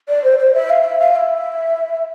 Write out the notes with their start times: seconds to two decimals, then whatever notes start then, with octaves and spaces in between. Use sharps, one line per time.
0.09 D5
0.24 C5
0.39 C5
0.55 E5
0.70 F5
0.84 E5
1.00 F5
1.16 E5